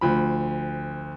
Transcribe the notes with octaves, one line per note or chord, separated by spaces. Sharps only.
D2 F3 B5